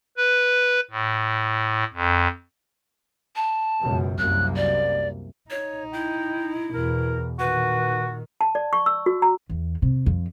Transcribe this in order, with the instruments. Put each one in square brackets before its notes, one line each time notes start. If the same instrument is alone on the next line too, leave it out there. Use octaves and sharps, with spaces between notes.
[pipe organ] B4
A2
F2
[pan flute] A5
[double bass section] C#2 F#2 B2
[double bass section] C2 F#2 A#3 [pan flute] F#6
[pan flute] D5
[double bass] D#4 [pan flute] C#5
[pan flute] E4 [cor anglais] G5
[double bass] E2 B2 [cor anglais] A#4
[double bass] A#2 D#3 [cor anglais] F#4 [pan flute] B4
[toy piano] A5
D5
C#6
E6
F#4
A#5
[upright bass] E2
C3
F2